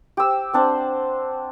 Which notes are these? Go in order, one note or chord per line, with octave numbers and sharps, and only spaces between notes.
G4 E6
C4 D4 C5 F#5